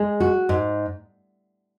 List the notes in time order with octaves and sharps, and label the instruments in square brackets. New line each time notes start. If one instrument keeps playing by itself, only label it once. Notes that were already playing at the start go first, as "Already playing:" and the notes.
Already playing: [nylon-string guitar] G#3
F#4
G#2